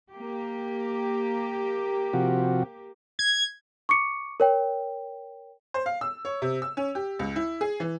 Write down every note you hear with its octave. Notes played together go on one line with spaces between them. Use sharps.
A#3 G4
C3 F3 F#4
G#6
C#6 D6 C#7
A#4 C#5 G5
C5
F5
E6
C#5
C3
E6
C#4
G4
C#2
E4
G#4
E3